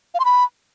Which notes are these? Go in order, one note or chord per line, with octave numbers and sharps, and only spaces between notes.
F5
C6
B5